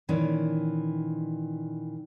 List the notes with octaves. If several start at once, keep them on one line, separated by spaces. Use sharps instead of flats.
A#2 D#3 E3 C#4